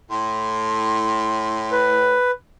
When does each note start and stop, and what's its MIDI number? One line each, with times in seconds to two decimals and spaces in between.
0.10 2.13 45
0.10 1.76 84
1.72 2.31 71